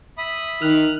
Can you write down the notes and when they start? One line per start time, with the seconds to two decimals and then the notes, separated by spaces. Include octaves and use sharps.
0.18 E5 B5 D#6
0.62 D#3 D#4 F6 F#6